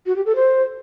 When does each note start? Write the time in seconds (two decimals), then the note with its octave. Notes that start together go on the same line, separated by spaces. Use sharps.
0.06 F#4
0.16 G4
0.26 A4
0.36 C5